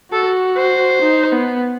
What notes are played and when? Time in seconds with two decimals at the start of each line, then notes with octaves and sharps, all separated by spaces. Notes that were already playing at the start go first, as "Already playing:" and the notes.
0.12 F#4 A4
0.57 C5
1.02 D#4
1.32 B3